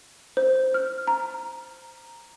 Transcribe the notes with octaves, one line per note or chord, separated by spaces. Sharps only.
C5
F6
A#5